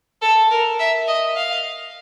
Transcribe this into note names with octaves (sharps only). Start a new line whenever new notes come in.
A4
A#4
E5
D#5
F5